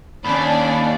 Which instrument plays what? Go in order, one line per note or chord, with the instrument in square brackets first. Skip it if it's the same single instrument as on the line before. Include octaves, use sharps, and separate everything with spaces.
[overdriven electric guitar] D#2 [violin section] C#4 D4 D5 [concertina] B5